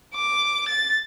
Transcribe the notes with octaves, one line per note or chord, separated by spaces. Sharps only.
D6
A6